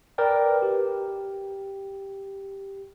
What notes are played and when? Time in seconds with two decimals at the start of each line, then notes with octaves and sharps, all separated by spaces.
0.18 A#4 B4 D5 G5
0.62 G4